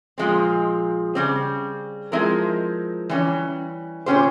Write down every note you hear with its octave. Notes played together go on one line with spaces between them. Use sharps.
A#2 F3 G#3 C4
C#3 G3 C4
F3 G#3 C4 E4 A#4
E3 G3 C#4
A#2 G#3 C#4 G4 C5